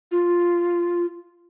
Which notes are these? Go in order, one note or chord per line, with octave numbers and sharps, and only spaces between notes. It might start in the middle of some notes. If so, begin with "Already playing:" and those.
F4